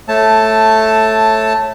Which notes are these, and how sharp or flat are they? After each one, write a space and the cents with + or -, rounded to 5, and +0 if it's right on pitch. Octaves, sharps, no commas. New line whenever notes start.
A3 +0 C#5 -15 A5 +5